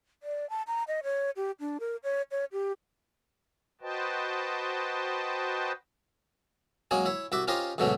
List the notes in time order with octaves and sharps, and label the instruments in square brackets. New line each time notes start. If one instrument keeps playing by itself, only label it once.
[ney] D5
A5
A#5
D#5
C#5
G4
D4
A#4
C#5
C#5
G4
[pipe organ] F#4 B4 C5 D#5 G5 A5
[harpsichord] F#3 G#3 A#3 C#4 G#4
E4 C#5
C2 F#4 E5 D6
C#4 F4 G4 A#4 C5 D#5
D2 G#2 B2 F#3 A3 C#4